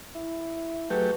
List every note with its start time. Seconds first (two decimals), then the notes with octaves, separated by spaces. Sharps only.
0.15 E4
0.90 F#3 A3 G4 G#4 B4